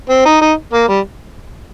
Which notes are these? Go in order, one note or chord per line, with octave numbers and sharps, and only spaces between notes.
C4
D#4
D#4
A#3
G3